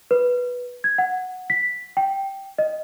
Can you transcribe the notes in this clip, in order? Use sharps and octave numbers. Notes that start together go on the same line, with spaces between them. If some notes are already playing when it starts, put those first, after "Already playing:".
B4
G#6
F#5
B6
G5
D#5